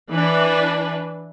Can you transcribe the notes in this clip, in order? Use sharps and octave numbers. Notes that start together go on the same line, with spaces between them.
E3 D4 B4